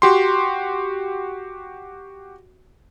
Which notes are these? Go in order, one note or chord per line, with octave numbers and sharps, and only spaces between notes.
F#4 G4 C6